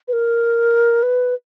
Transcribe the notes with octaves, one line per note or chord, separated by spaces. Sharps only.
B4
A#4
B4